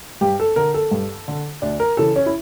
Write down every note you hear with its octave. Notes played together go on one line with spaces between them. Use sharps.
G2 G4
A4
D3 A#4
A4
G2
D3
D2 D4
A#4
C#3 E3 A4
C#4
E4